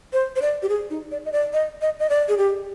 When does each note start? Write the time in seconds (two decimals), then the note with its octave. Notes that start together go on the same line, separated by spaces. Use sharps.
0.13 C5
0.36 C5
0.42 D5
0.63 G4
0.69 G#4
0.90 D#4
1.11 D5
1.25 D#5
1.32 D5
1.53 D#5
1.82 D#5
2.00 D#5
2.10 D5
2.29 G#4
2.37 G4